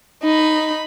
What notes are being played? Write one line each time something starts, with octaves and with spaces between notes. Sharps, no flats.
D#4 B5